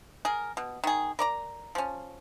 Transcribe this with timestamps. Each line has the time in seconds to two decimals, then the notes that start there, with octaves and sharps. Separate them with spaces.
0.25 G#4 A#4
0.57 B2
0.84 D#3 G#4
1.19 A#4 D5 A#5
1.75 F3 C#4